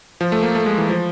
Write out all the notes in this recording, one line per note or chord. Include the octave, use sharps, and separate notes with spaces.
F3
A3
A#3
A3
G#3
E3
F3